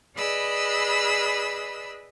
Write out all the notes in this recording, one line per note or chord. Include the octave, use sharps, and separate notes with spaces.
G#4 B4 D5 D#5 B5 E6